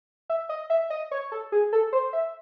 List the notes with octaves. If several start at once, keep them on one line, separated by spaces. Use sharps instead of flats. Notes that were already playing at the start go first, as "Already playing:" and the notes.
E5
D#5
E5
D#5
C#5
A4
G#4
A4
C5
E5